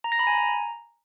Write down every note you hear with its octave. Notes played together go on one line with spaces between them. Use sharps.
A#5
A#6
B5
G#5
A#5